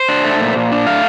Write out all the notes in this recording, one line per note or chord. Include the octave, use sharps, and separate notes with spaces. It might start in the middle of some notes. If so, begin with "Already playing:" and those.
Already playing: C5
D4
A3
A#2
A#2
D4
A3 F5